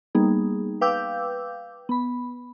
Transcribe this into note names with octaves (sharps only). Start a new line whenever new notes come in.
G3 A#3 B3 D#4 G#4
B4 F5 G5 D6 E6 G6
B3 B5